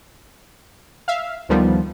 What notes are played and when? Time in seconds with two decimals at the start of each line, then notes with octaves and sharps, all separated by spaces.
1.08 E5 F5
1.49 D2 D#3 F3 G3 B3